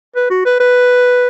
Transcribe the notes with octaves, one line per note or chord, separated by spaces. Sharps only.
B4
F#4
B4
B4